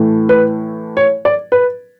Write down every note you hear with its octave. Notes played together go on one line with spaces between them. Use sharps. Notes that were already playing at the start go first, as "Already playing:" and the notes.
Already playing: A2 E3 A3
B4
C#5
D5
B4